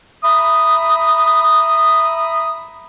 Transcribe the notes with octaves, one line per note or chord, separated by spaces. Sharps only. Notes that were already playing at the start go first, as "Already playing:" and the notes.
E5 A#5 B5 D#6